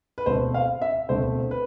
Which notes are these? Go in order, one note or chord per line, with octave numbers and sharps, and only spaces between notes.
B4
E1 D2 D3 A3 C4 C5
F5
E5
E1 D2 D3 A3 C4 C5
B4